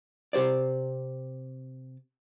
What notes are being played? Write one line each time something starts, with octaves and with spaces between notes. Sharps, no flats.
C3 G4 C5 D5